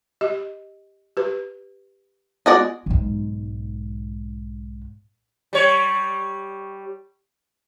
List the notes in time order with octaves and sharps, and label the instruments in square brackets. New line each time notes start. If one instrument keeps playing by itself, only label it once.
[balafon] G4 D#5
G4 B4
[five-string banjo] G#3 F#4 D5 [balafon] B3 F4
[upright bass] B1 G#2
[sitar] G3 C#5